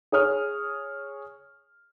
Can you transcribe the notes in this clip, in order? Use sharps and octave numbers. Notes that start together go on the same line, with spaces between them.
G#4 C#5 D#6 F6